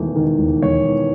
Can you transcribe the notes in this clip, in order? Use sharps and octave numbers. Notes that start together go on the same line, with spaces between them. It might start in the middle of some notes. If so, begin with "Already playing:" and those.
Already playing: E1 E2 D#3 A3
D#3
E1
E1 C#5
E2